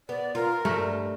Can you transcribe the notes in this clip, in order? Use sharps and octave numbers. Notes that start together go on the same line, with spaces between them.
B3 D5
F4 A#4
G2 A3